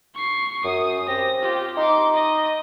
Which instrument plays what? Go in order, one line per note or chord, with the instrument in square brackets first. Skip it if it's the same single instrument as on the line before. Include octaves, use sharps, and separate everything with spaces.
[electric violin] C#6 C7
[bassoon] F#2 [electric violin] D#6
[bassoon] C4 [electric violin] G4 A#6
[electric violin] F4 G4
[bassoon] D#4 [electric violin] C6 D6
[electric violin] D#5